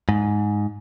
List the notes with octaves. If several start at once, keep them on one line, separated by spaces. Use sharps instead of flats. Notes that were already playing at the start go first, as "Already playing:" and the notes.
G#2